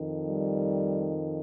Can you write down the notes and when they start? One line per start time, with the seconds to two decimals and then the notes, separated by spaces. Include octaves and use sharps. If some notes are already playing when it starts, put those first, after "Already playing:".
Already playing: F2 D#3
0.28 G3